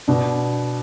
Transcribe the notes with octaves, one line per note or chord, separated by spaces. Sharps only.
B2 D4